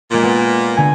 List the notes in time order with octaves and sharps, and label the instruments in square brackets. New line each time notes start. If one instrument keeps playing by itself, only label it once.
[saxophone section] A#2 [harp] G#3 D7
[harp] B3
D3 G#5 C#7